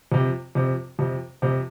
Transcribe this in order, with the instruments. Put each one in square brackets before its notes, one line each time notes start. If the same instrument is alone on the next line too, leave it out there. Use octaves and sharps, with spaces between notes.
[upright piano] F2 C3 F3
F2 C3 F3
F2 C3 F3
F2 C3 F3